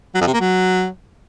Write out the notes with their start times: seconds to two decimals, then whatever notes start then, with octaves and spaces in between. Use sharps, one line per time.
0.14 F#3
0.21 F2
0.27 C3
0.34 A#3
0.40 F#3